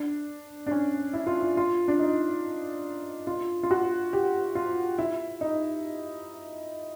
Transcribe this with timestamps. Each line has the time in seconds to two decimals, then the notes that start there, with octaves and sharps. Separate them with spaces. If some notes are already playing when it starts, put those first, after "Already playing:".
Already playing: D4
0.67 D4
0.71 C#4
1.13 E4
1.27 F4
1.41 E4
1.57 F4
1.88 D4
1.99 D#4
3.27 F4
3.63 F4
3.71 F#4
4.13 G4
4.55 F4
4.99 E4
5.41 D#4